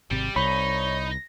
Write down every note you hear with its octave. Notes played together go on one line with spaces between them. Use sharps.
G#1 C3 G3
C2 D#4 C#5 B5